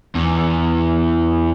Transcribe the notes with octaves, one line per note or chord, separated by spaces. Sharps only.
E2